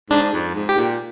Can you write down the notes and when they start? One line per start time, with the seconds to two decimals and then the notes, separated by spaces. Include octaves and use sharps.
0.11 G#2 D4
0.33 F2
0.55 G#2
0.69 G4
0.77 A#2